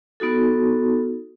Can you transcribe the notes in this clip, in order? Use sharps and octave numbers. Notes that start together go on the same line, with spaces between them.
B3 D#4 F#4 A4